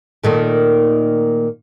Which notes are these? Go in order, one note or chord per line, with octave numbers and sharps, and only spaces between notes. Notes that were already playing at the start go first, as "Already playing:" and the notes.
A#2 D#3 A3